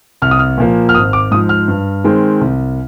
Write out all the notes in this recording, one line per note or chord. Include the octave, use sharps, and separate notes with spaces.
C2 F6
D#6
F6
A#2 F3 A#3
F6
G#1 D#6
D6
G#2 F3 D#6
F6
G2
D#3 G#3 C4
C2